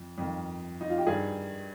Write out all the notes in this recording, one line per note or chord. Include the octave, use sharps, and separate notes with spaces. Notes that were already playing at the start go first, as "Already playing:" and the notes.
Already playing: F2
F2 D#3
D#4
F4
G4
G2 D#3 G#4